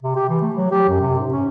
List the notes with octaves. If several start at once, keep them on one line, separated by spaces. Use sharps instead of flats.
C3
G4
E3
A3
F#3
G4
F#2
C3
G#2
C#4